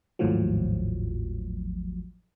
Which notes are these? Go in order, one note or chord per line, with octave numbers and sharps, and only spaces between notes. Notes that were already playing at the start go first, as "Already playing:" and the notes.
G#1 D#2 A2 F3 F#3